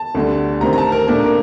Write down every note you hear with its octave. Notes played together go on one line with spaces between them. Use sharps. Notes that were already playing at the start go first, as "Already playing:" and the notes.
Already playing: A5
D2 D3 G3
C3 D#3 A3 C4 A#5
A#5
A5
A#4
A#2 A3 D4 A#4
A#4